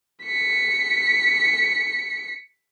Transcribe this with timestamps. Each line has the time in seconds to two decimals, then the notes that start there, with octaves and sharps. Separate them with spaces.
0.24 B6 C#7